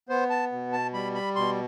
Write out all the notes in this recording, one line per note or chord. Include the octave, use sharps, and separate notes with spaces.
B3 C5
A5
B2
A5
G3 B5
B5
B2 C6